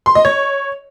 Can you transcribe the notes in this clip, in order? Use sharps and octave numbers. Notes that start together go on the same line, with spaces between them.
C6
D#5
C#5